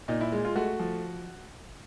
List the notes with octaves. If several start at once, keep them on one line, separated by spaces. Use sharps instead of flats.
A#2 D#4
E4
G#3
F4
A3 F#4
F3